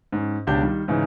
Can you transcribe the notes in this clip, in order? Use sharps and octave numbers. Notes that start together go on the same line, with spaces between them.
G#2 C#4
C#2 B2 D4 G4 G6
D#3 G3
G#2 C#3 E3 D#4